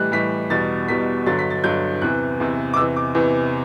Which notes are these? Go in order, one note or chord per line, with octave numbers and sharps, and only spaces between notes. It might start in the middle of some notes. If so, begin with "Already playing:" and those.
Already playing: A2 E3 G3 F#6
A2 E3 G3 B6
E2 B2 G3 A6
E2 B2 G3 B6
G2 D3 F#3 A6
B6
A6
G2 D3 F#3 G6
E2 C3 E3 F#6
E2 C3 E3
D6
E2 C3 E3 E6
D6
E2 C3 E3